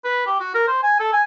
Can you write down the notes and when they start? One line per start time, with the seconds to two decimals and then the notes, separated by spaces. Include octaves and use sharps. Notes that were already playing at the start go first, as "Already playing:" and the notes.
0.05 B4
0.27 G4
0.40 F#4
0.55 A#4
0.68 C5
0.83 G#5
1.00 A4
1.13 G#5